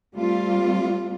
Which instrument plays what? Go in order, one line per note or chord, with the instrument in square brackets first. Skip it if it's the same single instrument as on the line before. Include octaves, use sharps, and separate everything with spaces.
[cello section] G3 A3 C4 F4